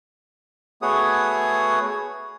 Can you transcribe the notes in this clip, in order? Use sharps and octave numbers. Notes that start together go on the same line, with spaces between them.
A3 B3 F#4 G#4 C#5 D#6